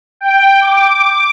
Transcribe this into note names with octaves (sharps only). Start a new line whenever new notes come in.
G5
D6